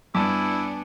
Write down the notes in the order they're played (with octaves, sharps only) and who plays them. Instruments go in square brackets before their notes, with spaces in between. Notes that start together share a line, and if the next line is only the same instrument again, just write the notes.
[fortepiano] G2 [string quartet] B3 D4 [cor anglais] E4 [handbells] G#5 A5 D6